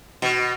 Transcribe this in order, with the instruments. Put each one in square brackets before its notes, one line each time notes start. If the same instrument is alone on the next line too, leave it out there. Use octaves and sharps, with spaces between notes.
[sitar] B2